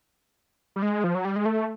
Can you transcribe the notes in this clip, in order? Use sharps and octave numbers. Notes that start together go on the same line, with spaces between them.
G3
G#3
F3
F#3
G3
G#3
A3